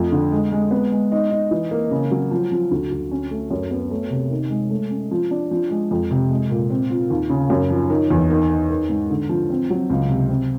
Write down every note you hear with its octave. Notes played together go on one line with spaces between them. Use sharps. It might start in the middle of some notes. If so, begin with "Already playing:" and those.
Already playing: F2 A3
D3
G#3
G#3
B3
G#3
D#4
D#4
E3
A#3
C#3
F#3
F3
F3
D2
D2
C#4
A3
F#2
B3
A3
C3
D#3
G#3
A3
C#4
F3
D4
F3
G#3
F2
C3
G#3
A#2
C4
F4
D#2
C#3
F#2
F3
D#3
E2
D#3
D#3
D#3
G#2
D3
F3
C4
F#3
C#2
C3
C4